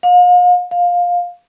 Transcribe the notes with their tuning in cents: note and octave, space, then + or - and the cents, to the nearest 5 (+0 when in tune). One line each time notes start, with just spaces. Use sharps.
F5 +40
F5 +15